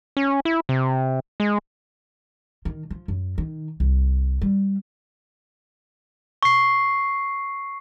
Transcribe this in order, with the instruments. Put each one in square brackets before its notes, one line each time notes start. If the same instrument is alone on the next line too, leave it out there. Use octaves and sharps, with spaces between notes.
[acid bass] C#4
E4
C3
G#3
[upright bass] D#3
F3
F#2
D#3
C2
G3
[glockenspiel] C#6 C7